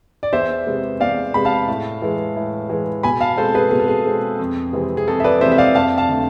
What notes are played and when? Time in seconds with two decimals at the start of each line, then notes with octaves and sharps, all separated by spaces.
0.23 D5
0.33 E2 C5 E5
0.67 C3 G#3 B3
1.00 E2 D5 F5
1.34 C3 G#3 B3 B5
1.45 F5 A5
1.68 A2
2.02 E3 G#3
2.36 A2
2.70 E3 G#3
3.03 B2 G#5 B5
3.21 F5 A5
3.38 G#3 C4 A4 C5
3.54 G#4 B4
3.71 B2 G#4
3.80 A4
3.88 G#4
4.05 G#3 C4
4.39 F2
4.73 C3 E3 G#3 C4
4.97 G#4
5.08 F2 A4
5.20 E5
5.24 B4 D5
5.41 C3 E3 G#3 C4 C5 E5
5.52 E5
5.58 D5 F5
5.75 F2 F5 A5
5.97 F5 A5
6.09 D3 A3